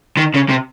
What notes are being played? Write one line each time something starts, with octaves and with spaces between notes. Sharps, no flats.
D#3
C#3
C3